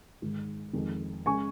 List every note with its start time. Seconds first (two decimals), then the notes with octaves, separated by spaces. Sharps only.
0.22 G#2 D#3 G#3
0.73 F2 D#3 G#3
1.26 C#3 G#3 G#5 C#6